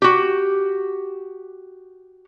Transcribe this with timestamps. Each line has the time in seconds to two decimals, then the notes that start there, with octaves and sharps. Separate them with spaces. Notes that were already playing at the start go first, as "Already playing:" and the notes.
0.02 F#4 G4